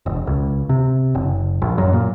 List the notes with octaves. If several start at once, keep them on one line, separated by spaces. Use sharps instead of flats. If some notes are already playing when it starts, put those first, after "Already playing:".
E1
C#2
C3
F#1
A#1
F#2
A#2